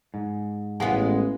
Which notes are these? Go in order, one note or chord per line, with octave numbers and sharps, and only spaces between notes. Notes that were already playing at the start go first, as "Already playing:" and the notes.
G#2
A1 G#3 B3 F5 F#5 G#5